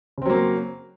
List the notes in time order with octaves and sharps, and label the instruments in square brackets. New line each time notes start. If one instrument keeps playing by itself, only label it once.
[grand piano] C#3
C4
F#3
A#3